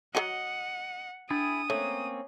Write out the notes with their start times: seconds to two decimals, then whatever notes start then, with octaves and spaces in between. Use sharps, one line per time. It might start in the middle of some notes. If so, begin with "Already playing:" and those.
0.15 F#3 F4 F#4 D#5 F#5
1.30 D4 E4 G#4 D#6 A6
1.70 A3 A#3 C4 C#4 C#5